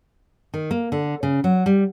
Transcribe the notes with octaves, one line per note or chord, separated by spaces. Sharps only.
D#3
A#3
D3
C#3
F#3
G3